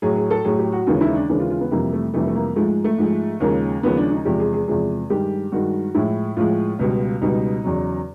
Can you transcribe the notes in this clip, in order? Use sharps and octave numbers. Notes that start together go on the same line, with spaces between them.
A2 F#3 G#4
G#4
A4
A2 F#3 G#4
G4
F#4
D#2 C#3 E3 G#3 F4
E4
D#4
D4
D#2 C#3 E3 G#3 D4
F4
F4
B3
F2 C3 E3 G3 A#3
A3
F2 C3 E3 G3 A3
A3
A#3
G#2 F3 G#3 A3
A3
G#2 F3 G#3
D#2 C#3 F3 G#3 A#3
D#2 C#3 F3 G#3 B3
D4
D#4
E2 C3 F3 G#3 G4
G#4
G#4
E2 C3 F3 G#3 G#4
G2 D#3 G#3 G4
G2 D#3 G#3 F#4
A2 F3 G#3 E4
A2 F3 G#3 F4
C#2 B2 G3
C#2 B2 G3 D#4
E2 C#3 F#3